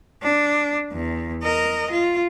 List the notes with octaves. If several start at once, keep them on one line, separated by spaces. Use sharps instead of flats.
D4
E2
A#4 D#5
F4